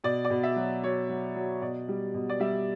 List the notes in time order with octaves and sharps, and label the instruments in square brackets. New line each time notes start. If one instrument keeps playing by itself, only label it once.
[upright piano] B2 D5
D5
B2
E5
F#3
F#3 C#5
F#3
F#3
B2 D5
G3
B2
D5
G3 E5